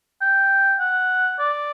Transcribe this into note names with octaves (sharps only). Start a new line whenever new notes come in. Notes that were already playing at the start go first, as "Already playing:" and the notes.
G5
F#5
D5